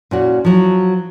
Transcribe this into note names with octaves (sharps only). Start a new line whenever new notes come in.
A#2 C#4 F#4
F3 F#3